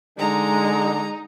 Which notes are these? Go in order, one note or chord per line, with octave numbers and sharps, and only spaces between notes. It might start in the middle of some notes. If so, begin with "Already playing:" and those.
D3 G#3 D#4 A#5